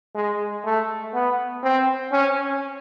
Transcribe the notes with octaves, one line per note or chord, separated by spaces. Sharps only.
G#3
A3
B3
C4
C#4